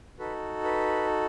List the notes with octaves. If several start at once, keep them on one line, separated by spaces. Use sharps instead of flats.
D#4 F#4 A4 B4
B4